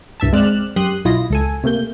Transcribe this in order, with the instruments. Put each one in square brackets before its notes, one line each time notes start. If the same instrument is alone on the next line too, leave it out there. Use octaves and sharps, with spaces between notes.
[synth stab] C2 G2 E5 A5
G#3 C4 D5 F6 F#6 E7
F#2 G4 C6 D#6 F#6
B1 E4 F4 D#5 A#6
C#2 A4 G#5
C3 A3 A#3 G6